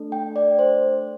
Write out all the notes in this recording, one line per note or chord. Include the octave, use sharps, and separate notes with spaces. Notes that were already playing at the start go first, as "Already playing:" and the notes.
Already playing: A3 D4 A4
G5
D5
C5